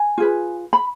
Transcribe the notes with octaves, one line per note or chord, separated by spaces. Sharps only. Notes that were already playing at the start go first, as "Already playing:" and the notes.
Already playing: G#5
F4 G#4 B4
B5